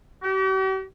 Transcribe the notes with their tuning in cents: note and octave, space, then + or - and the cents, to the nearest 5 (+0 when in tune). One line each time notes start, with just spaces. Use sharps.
G4 -45